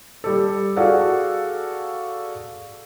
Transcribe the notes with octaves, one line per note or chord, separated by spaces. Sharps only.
G3 G4 A4
F#4 G#4 A4 D5 F5 F#5